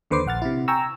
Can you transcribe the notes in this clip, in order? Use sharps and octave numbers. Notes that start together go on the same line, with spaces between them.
D#2 D3 B4 C5 D6 C7
A#1 F#5 F6 A6
C3 E4
G5 G#5 A#5 C#6 E6